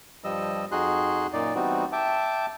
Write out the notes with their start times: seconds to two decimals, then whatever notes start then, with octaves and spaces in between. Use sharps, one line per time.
0.24 G2 F3 G3 D#5 E6
0.72 F2 D#4 F#4 G#4 C6 F#6
1.33 F#2 A#2 D#4 D5
1.55 E3 G3 B3 C4 D#4 F#4
1.92 E5 G5 A5 D6